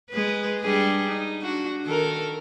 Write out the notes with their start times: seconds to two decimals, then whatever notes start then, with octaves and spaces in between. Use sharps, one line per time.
0.10 G#3 B4
0.61 G3 D4 G#4
1.08 D#4
1.42 D4 F#4
1.84 D#3 A4 A#4